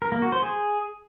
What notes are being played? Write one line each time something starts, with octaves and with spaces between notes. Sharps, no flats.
A#4
A#3
F#4
C5
G#4